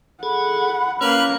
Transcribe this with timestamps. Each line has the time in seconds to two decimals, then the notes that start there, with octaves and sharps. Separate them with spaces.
0.23 G#4 A4 F#5 B5
1.01 A#3 C#4 B4 C#5 F6